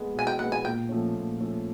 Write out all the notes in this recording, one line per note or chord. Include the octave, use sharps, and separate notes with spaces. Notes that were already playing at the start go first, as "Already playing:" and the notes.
Already playing: G#3 B3
B2 G#5
G5
G#3 B3 F#5
G#5
A#2 G5
F3 A3 C#4
A#2
F3 A3 C#4